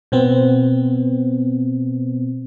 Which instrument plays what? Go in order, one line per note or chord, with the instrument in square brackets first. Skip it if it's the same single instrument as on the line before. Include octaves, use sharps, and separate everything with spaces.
[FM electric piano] B2 B3 C4